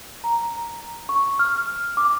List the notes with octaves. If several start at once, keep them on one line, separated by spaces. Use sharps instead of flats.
A#5
C#6
F6
D6